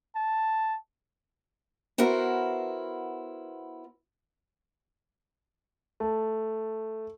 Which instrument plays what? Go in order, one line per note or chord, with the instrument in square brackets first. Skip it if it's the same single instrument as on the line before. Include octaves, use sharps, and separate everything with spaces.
[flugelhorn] A5
[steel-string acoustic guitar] B3 E4 F#4 A#4 C5
[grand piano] A3 A5